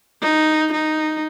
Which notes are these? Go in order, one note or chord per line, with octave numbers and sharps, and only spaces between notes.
D#4
D#4